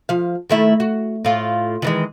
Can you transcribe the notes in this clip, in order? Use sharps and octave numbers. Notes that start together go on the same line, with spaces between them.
F3 F5
D#3 A3 E4
F#4
A2 F4
D#3 E3 G#3